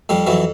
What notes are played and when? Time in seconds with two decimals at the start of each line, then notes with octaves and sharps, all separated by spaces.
0.09 F2 F3 G3
0.27 F2 E3 F#3